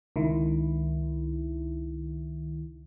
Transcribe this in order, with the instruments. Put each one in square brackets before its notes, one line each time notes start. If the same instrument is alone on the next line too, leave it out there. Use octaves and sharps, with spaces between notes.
[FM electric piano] C#2 D#3 E4